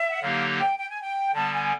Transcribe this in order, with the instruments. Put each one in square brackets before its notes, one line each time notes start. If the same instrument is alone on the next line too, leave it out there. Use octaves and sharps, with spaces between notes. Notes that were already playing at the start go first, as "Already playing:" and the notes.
Already playing: [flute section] E5
F#5
[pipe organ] D3 F#3 A#3 D#4 G4 [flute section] F5
[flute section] G5
G5
G#5
G5
[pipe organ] D3 G3 B3 [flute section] A5
[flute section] G#5